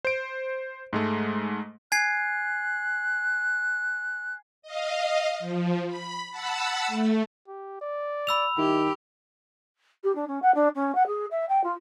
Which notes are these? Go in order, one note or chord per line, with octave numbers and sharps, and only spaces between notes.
C5 D7
G#2 G#3 A3
G#5 F#6 G#6 C7
D#5 F5
F3
B5
F#5 A5 B5 E6
A3
G4
D5
B5 E6 F7
D#3 E4 G4
G4
D4
C#4
F#5
D4
C#4
F#5
G#4
E5
G5
F4